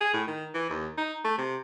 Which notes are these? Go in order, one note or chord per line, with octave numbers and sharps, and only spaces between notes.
G#4
A2
D#3
E3
D#2
D#4
A3
C3